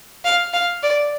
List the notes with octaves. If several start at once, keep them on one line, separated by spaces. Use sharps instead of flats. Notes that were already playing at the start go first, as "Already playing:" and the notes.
F5
F5
D5